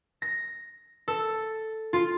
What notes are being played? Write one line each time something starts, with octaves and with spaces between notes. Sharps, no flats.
A#6
A4
F4